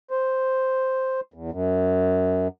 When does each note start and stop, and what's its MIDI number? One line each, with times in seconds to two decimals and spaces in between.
0.10 1.21 72
1.34 1.51 40
1.52 2.48 42